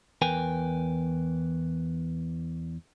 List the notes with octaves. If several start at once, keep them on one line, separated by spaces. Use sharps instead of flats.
E2 A#4 B4 G5 G#5